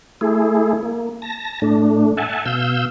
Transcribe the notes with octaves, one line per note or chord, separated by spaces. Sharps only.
A3 E4 G#4
A#3
A5 A#6
A2 A3 D4
E5 F#5 G#5 A5
B2 F5 E6 G6